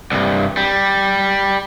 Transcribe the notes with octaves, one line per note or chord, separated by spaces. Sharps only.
C2 G2
G3